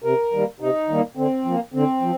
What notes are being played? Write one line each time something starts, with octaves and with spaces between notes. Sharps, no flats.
C3 A#4
D#3 G3 A#3
C3 D#4
D#3 G3 A#3
D3 C4
F3 A#3
D3 C4
F3